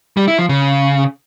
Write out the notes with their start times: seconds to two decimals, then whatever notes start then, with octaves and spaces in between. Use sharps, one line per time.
0.17 G3
0.28 E4
0.38 F3
0.49 C#3